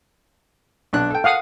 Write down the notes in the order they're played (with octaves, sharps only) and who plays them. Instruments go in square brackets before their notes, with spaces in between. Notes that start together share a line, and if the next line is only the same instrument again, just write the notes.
[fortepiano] B1 D4 F#6
A4 G5
[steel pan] F5 F#5 D#6